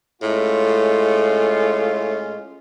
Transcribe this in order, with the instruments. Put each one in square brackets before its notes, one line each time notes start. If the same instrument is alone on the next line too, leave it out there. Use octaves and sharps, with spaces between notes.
[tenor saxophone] A2 [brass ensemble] G#3 C#4 F4